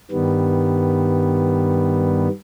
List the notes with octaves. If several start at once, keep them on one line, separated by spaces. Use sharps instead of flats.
G2 D#3 G3 B3